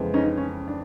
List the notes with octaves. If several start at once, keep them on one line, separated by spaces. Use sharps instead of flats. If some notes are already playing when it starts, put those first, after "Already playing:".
Already playing: F2 C#3 E3 G#3 B3
C#4 D#4
C#4
D4